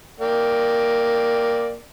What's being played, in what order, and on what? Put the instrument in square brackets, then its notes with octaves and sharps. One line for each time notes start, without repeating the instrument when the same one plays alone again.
[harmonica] A#3 D5 G5